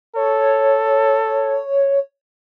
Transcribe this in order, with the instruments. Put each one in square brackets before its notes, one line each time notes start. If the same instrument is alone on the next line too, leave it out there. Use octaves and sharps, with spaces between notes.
[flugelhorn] A4 [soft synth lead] C#5